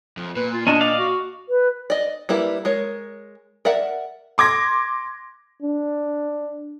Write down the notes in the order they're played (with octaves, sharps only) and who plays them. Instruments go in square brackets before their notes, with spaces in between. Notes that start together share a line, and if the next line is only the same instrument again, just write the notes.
[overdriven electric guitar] F2
[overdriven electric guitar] A#2 [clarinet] B4
[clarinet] F4
[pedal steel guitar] C#4 D4 [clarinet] D#5
[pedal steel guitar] D5 F5
[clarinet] F#4
[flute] B4
[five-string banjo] D5 D#5
G3 A#3 E4 B4
G#3 A#4 C#5
A#4 D5 E5 F#5
[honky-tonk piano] C6 D6 G#6 A#6
[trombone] D4